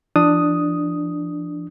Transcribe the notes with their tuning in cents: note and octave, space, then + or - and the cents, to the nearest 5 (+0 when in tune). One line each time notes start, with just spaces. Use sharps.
F3 -40 D4 +10 D#6 +0